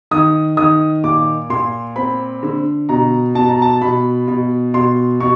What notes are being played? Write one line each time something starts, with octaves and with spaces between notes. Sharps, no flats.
D#3 D#6
D#3 D#6
A#2 D6
A#2 C6
C4 B5
D3
B2 A#5
B2 A5
A#5
A5
B2 B5
B2
B2 C6
B2 C#6